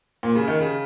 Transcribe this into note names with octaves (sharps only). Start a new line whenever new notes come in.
A#2
C#3
D#3
C#3